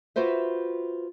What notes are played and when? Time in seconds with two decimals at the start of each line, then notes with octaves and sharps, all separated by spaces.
0.16 F4 F#4 B4 C5 E5